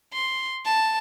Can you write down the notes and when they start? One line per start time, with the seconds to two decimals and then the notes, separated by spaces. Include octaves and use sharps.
0.13 C6
0.65 A5